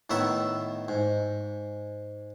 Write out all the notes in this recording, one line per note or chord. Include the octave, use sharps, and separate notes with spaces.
A2 D#3 B3 E5 A#5 C#6
G#2